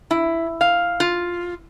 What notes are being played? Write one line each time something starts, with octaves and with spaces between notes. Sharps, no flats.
E4
F5
F4